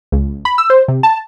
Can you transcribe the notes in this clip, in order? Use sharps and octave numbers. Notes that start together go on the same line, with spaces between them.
C#2
B5
E6
C5
C3
A5